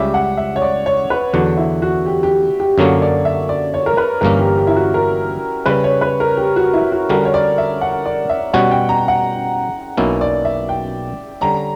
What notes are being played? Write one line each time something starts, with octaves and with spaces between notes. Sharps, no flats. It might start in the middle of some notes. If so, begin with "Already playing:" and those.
Already playing: C#2 C#3 G3 C#4 G4 E5
F#5
E5
C#5
D5
C#5
B4
E2 D3 F#3 F#4
E4
F#4
G4
G4
G4
F#2 D3 F#3 A#3 C#4 C#5
D5
E5
D5
C#5
A#4
B4
G1 G2 E3 A#3 C#4 A#4
G4
G4
E4
F#4
A#4
C#3 G3 C#4 B4
C#5
B4
A#4
G4
F#4
E4
F#4
D3 G3 C#4 F#4 A#4
C#5
D5
E5
F#5
D5
E5
B2 G3 C#4 F#4 C#5 F#5
G5
A#5
F#5
B1 B2 A#3 C#4 E4
D5
E5
G5
D3 G3 C#4 A#5